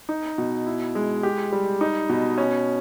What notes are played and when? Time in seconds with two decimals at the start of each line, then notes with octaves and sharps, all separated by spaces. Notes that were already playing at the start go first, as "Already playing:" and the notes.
0.09 D#4
0.38 B2
0.66 E4
0.95 G#3
1.23 G4
1.52 G3
1.81 D#4
2.09 B2
2.38 C#4